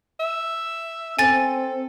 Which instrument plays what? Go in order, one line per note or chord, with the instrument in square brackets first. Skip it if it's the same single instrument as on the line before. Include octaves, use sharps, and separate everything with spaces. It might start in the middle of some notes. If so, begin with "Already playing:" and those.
[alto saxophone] E5
[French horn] C4 [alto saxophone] A4 [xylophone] G#5 A6